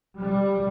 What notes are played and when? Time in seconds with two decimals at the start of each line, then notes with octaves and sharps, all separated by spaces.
0.17 G3